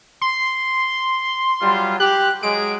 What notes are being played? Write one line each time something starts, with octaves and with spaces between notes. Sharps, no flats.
C6
F#3 G3 F4
G4 F#6
F#3 G#3 D7